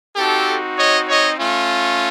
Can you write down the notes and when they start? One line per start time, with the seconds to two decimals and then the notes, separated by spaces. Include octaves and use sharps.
0.16 C4 D#4 F#4 G4 A4
0.77 C#5 D#5
1.08 C#5 D#5
1.39 A3 C#4 F4